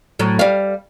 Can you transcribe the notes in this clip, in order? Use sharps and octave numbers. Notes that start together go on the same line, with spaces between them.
A2 F#3
G3 F5